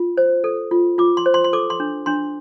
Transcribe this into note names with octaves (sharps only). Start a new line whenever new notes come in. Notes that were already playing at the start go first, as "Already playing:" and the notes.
Already playing: F4
C5
A4
F4
F4 D6
C6
C5
C6
C6
A4 D6
C6
D4
D4 C6